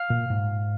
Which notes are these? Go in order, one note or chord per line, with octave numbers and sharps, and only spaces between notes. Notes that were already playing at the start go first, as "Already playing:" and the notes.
Already playing: F5
A#2
G#2